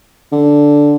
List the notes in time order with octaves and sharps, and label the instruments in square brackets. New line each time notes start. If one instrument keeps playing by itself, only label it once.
[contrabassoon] D3